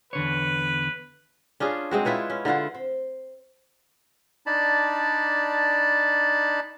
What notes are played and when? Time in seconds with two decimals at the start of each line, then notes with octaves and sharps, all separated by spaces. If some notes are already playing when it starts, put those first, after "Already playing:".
0.13 E2 D3 B4 C#5
1.60 C#4 D4 F4 G#4
1.91 G#3 C4 F#4
2.05 E4 F4 B4 C#5
2.30 C#4
2.45 D3 E4 F4 F#5
2.75 C4
4.46 D4 D#4 D5 A5 B5